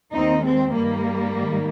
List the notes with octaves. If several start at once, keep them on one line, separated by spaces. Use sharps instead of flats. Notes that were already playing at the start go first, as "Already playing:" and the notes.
D#2 D#3 C4 D#4
G#3 C4
G2 D#3 G3 A#3
G#2 D#3